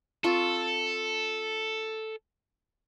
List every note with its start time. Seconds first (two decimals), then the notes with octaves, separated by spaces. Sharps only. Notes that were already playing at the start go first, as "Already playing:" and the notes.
0.24 C4 F4 A4 C#6